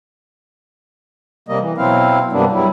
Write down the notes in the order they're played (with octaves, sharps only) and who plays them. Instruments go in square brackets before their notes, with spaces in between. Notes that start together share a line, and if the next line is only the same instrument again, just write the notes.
[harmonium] C3 G3 A#3 D#5
E3
B2 F#3 C4 E4 F5
G2 C3 G3 A#3 B3 D4
F#3 G3 E4